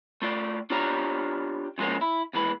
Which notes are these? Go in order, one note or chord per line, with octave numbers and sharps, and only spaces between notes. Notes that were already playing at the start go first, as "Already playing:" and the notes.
A3 F4 D5
D4 F4 G4 C#5 D5 A#5
C#3 F3 G#3 A#3 C#4
E4
D#2 E3 G#3 B4